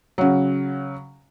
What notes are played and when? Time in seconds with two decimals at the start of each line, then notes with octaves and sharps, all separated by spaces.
0.18 C#3 F#3